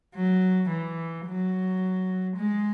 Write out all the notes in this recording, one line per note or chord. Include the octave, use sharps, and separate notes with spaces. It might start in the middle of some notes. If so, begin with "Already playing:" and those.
F#3
E3
F#3
G#3